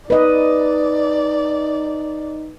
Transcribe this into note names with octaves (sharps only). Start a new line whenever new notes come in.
D#4 B4 D5 D#5